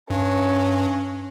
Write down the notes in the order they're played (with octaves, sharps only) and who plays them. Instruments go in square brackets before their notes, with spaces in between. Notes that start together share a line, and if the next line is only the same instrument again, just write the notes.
[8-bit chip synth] G2 [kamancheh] C#4